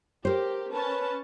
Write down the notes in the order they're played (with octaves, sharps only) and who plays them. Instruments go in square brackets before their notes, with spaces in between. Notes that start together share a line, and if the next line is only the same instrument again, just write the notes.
[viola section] G4 [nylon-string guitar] A#4 C5
[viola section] C#4 A5 [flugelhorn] B4